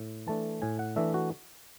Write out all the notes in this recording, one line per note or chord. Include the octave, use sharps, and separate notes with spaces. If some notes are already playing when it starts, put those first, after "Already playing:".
Already playing: A2
E3 A3 D4 A5
A2 G#5
F#5
E3 A3 D4 E5
F#4